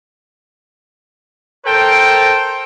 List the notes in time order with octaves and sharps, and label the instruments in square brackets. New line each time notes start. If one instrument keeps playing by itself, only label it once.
[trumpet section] A4 A#4 C5 G5